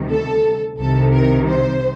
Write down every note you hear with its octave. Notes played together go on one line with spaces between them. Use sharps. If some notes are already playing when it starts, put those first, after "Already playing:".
Already playing: D2 C3 D#3 G3
A4
C2 C3 D#3 A4
A#4
C5